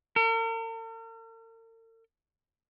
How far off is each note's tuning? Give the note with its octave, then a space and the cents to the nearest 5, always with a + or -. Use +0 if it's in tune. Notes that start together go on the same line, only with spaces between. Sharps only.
A#4 -45